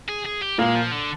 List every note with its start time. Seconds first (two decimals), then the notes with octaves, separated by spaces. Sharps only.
0.08 G#4
0.25 G#4
0.42 G4
0.58 A#2 G#3 A#3
0.75 F3
0.91 D3